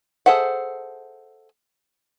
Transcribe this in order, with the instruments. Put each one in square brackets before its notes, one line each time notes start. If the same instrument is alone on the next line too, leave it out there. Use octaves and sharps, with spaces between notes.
[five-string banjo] G#4 A4 C5 E5 F#5